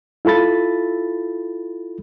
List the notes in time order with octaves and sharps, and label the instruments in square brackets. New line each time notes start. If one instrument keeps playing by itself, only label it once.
[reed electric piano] E4 F4 A4 B5 A6